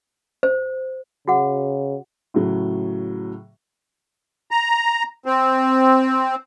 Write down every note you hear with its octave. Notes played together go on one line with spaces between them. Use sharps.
C5
C#3 F#4 G#4 F#5
A2 C#3 F#3
A#5
C4